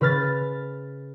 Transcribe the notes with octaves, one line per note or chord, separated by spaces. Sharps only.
C#3 B4 F6 A6